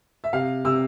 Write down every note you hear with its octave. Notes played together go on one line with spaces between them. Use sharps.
E5
C3 F5
C3 E6